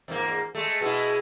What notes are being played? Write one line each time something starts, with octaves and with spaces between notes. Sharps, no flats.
E2 G#2 A#3
G#3 A3
B2 G#3 E4